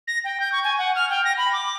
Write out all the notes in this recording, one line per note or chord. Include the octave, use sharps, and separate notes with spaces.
A#6
G5
G6
C#6
G#5
F#5
F6
G5
A#6
B5
D6